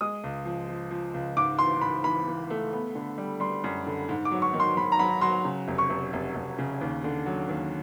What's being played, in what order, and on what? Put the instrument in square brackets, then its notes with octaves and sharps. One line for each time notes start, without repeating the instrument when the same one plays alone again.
[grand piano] G#3 [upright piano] D#6
[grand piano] C#2
F3
F3
F3
C#2
[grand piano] G#2 [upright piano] D6
[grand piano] E3 [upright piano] C6
[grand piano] G#2 [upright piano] B5
[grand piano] E3 [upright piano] B5
[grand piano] E3
A3
B3
D3
G3
[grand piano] G3 [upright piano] C6
[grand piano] F#2
D3
G#2
[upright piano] D6
[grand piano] F#3
[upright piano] C#6
[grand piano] D#3
[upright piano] C6
[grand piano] D#3 [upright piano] B5
[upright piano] A#5
[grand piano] F#3 [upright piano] B5
[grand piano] F#3 [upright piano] C6
[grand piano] C#3
F1
[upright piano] C#6
[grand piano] F1
F1
F1
C#3
D#2
D3
F#3
D#2